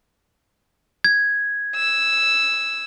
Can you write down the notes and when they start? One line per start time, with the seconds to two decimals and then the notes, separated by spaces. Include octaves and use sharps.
1.04 G#6
1.76 E6